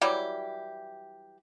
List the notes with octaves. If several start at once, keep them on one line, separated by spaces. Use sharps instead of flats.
E3 F#3 G3 G4